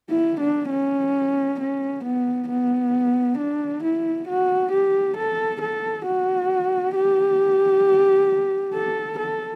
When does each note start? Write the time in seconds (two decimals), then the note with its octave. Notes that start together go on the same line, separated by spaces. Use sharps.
0.10 E4
0.40 D4
0.70 C#4
1.60 C#4
2.04 B3
2.48 B3
3.38 D4
3.83 E4
4.28 F#4
4.72 G4
5.17 A4
5.61 A4
6.06 F#4
6.95 G4
8.74 A4
9.18 A4